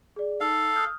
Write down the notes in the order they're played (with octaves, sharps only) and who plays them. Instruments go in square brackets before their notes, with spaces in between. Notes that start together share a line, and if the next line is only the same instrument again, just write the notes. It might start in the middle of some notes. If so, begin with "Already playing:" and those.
[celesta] G#4 D5
[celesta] D#4 [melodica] A4 F5
[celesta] D#6 F6 G6